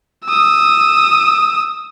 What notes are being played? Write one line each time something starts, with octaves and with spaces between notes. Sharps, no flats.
D#6 E6